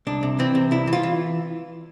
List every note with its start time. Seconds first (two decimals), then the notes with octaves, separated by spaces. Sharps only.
0.07 C2 D4
0.23 C3
0.39 E3 C4
0.55 C3
0.71 C2 E4
0.87 E3
0.93 F4
1.03 E3